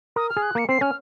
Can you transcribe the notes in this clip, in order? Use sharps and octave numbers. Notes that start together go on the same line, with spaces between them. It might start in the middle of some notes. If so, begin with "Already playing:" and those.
A#4 D#6
F6
G#4
F#6
A#3 C#7
C4 C7
C#4 F6